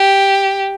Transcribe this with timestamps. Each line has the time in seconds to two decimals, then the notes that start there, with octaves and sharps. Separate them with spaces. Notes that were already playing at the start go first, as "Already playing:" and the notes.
Already playing: G4